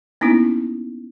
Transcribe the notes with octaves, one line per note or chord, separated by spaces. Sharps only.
A#3 B3 C#4 D#4 E4